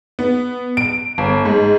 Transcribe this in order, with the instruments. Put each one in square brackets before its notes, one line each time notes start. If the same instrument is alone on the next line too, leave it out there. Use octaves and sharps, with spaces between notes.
[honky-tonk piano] B3
D7
G1
G#2